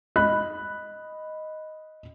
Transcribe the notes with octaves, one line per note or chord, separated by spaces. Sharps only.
D#5 B5 F#6